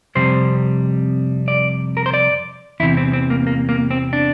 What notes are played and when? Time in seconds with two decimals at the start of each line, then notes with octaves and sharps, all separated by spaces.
0.15 F2 C3 G3 C5
1.48 D5
1.97 A#4
2.06 C5
2.14 D5
2.80 E2 E4
2.82 C3 E3
2.97 C4
3.13 C4
3.30 A#3
3.47 A#3
3.69 A#3
3.91 C4
4.13 D4